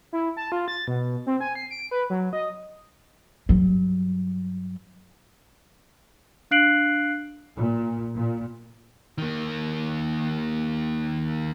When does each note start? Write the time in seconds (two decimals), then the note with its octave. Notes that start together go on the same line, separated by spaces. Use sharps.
0.13 E4
0.37 A5
0.52 F4
0.68 A6
0.87 B2
1.26 C4
1.40 G#5
1.55 C7
1.71 D7
1.91 B4
2.10 F#3
2.33 D#5
3.49 G2 F#3
6.51 D4 F5 F#6 C7 D7 F#7
7.56 A#2
8.15 A#2
9.18 D#3 A#3